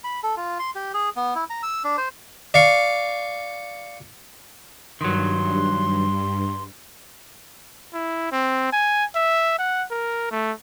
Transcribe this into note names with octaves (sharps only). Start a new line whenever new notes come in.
B5
A4
F4
C6
G4
G#4
B3
E4
A#5
E6
D4
C5
D5 F5 C#6
G2 D#3 F#3 C6
E4
C4
G#5
E5
F#5
A#4
A3